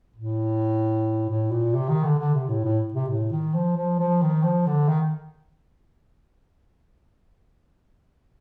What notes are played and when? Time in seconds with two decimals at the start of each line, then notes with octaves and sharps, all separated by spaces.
0.16 A2
1.29 A2
1.51 A#2
1.74 C3
1.89 D#3
2.04 D3
2.19 D3
2.34 C3
2.49 A2
2.64 A2
2.94 C3
3.08 A2
3.32 D#3
3.54 F3
3.77 F3
3.99 F3
4.22 D#3
4.43 F3
4.67 D3
4.88 D#3